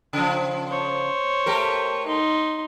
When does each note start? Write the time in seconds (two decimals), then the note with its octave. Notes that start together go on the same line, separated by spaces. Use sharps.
0.13 C#3 F3
0.68 C5 C#5
1.46 A3 G4 A#4
2.07 D#4 C6